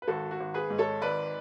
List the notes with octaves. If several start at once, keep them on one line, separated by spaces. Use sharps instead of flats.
B4
G#1 F#4 A4
F#4
G#1
G#4 B4
G#2
A4 C#5
G#1 B4 D5